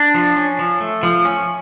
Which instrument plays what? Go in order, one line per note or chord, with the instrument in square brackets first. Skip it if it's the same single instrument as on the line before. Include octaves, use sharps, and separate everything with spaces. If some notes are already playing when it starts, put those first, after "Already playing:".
Already playing: [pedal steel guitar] D4
F3
C#4
F3
A3
F3
C#4